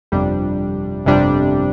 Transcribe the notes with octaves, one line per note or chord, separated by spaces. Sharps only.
G1 F2 C3 G3 D4
G1 F2 C3 G3 D4